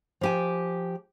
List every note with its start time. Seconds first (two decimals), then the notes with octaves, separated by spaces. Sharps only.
0.21 F3 G4 G#5